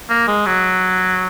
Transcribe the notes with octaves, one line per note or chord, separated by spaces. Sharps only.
A#3
G#3
F#3